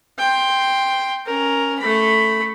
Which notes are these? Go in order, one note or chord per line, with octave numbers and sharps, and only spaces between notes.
G5 C6
C#4 A#4
A3 B5